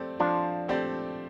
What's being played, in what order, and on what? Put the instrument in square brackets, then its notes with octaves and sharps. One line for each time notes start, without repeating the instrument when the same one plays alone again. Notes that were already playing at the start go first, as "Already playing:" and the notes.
Already playing: [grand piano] F3 A3 C4 G4 D5
[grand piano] F3 [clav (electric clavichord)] D4 F4
[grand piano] A3 C4 G4 D5